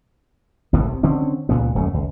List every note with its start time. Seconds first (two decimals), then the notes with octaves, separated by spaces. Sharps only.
0.73 G1 C2 A2 E3
0.88 C3
1.03 D3 C4 C#4
1.49 C#2 A#2 B3
1.75 D1 F#2 A3
1.94 C#2